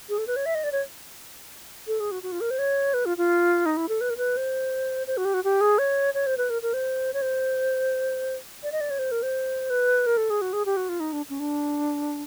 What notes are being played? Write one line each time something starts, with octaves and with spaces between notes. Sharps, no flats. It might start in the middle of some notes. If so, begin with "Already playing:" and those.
G#4
A4
B4
C#5
E5
D#5
D5
C#5
A4
G#4
F#4
F#4
F4
A#4
C5
C#5
B4
F4
F4
D#4
E4
A4
B4
A#4
B4
C5
C5
F#4
G4
F#4
G4
G#4
C#5
C#5
C5
B4
A#4
A#4
C5
C#5
C5
D5
D#5
D5
C#5
C5
A#4
C5
B4
A#4
A4
G#4
F#4
G#4
G4
F#4
F4
D#4
D4
C#4
D4